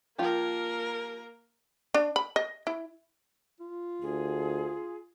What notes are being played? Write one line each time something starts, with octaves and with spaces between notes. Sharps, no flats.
F3 A#3 F4 G4 A#4
D4
B5
D#5
E4
F4
D2 G#4